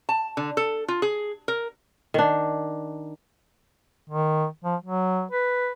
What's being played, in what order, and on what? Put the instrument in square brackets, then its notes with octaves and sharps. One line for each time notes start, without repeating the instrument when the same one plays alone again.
[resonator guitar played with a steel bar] A5
D3
A4
F4
G#4
A#4
[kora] D#3 D4
[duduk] D#3
F3
F#3
B4